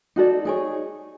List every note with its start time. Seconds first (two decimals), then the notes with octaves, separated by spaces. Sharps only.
0.16 D#4 F#4 A4 D5
0.45 D#4 G#4 C#5